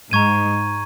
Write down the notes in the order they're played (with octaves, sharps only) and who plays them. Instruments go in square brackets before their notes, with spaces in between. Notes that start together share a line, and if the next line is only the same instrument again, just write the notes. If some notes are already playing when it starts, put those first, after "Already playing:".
[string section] G#2 [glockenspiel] A#5 C#6 G#6 D#7